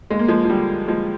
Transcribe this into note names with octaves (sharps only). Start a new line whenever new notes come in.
D#2 G#3
A#3
F3 G#3
F3
D3 G3
D#2 F3 G#3